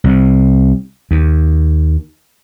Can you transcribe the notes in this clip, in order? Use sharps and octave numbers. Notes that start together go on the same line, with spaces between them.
C2 C3
D#2